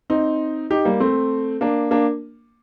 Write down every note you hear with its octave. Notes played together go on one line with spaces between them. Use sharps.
C4 D#4
D#4 G4
G3 A#3
A3 C4
A#3 D4
A#3 D4